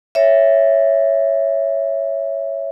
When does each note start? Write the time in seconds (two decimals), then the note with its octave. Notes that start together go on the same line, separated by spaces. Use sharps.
0.15 C#5 E5